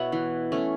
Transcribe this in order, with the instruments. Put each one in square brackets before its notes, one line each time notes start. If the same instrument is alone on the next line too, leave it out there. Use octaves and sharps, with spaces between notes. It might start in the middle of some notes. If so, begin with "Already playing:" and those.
Already playing: [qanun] B2 B3 E4 C#5 E5 F#5
E3
A3 C#4